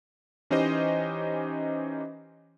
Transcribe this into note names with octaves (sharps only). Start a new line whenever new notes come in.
E3 C#4 D#4 G4 C5 D#5